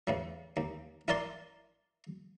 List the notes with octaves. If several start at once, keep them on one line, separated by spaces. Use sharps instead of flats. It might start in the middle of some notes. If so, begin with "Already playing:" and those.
E2 A2 F3
D#2
E4 A4 A#4 D5 A5 C6